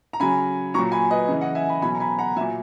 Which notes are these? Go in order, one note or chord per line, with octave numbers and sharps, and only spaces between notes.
A#5
C#3 F#3 G#5 B5
A#2 F#3 A#5 C#6
G#5 B5
B4 D#5
C#3 E3
D#5 F#5
E5 G#5
G#5 B5
B2 F#3 G#5 B5
A#5
G#5 B5
F#5 A#5
A#2 F#3 E5 G#5